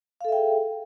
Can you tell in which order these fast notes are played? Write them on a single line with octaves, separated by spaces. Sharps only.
F5 A4 E5 G5 G#4